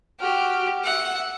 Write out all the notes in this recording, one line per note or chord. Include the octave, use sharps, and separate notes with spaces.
F#4 G4 F6
E5 F#5